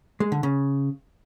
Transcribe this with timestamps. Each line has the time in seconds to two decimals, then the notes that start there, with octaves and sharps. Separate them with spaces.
0.20 G#3
0.32 D3
0.43 C#3